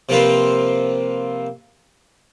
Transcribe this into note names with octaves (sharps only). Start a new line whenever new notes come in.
C3 F3 A#3 C4 F4 B4